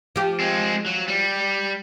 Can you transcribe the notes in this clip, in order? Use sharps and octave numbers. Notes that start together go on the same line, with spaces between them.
F3 G4
G#3 C4
F#3
G3